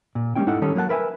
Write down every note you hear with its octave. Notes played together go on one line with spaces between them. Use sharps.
A#2
G3 G#3 A#3 C#4 E4 G5
G#2 D#4 E4 A4 F#5
D#3 G3 C#4 D#4 A4
F#3 A#3 A4 F#5 A5
A#4 B4 E5 G5 G#5